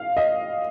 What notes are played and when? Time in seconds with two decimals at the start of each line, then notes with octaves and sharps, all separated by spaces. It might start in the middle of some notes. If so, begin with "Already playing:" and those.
Already playing: F5
0.17 D#5